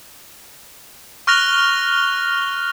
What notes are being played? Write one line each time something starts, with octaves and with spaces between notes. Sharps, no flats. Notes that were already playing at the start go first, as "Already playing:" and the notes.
C#6 F6 F#6 A#6 F7 G7